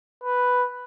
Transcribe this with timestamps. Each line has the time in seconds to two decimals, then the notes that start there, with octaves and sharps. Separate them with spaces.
0.24 B4